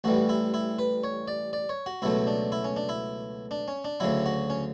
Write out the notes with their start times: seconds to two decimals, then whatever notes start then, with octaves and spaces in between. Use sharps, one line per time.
0.04 A1 A2 E3 G3 F#4
0.29 E4
0.54 E4
0.79 B4
1.04 C#5
1.28 D5
1.53 D5
1.69 C#5
1.86 F#4
2.02 C#2 B2 F#3 A3 E4
2.27 D4
2.52 E4
2.64 C#4
2.77 D4
2.89 E4
3.51 D4
3.68 C#4
3.85 D4
4.00 D2 C#3 F#3 E4
4.26 F#4
4.50 C#4